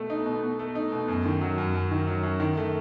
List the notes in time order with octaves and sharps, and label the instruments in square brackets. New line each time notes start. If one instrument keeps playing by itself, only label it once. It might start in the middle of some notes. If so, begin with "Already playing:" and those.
Already playing: [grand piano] B2 A3
D#4
B2
B2
A3
D#4
B2
F#2
D#3
F#3
F#2
F#2
D#3
F#3
F#2
D#3
A3